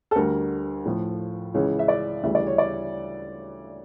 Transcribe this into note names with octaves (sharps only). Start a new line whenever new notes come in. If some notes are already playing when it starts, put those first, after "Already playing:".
A4
D2 D3 G3 A#4
A2 F3
C#2 C#3 E3 C#5
E5
D5
D2 C#3 E3 G3 E5
D5
C#5
D5